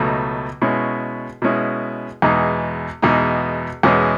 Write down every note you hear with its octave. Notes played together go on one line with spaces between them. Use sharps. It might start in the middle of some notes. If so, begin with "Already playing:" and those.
Already playing: C#2 B2 F#3 A3 D#4
B2 G#3 C#4 E4
B2 G#3 C#4 E4
E2 B2 G#3 D#4
E2 B2 G#3 D#4
E2 B2 G#3 C#4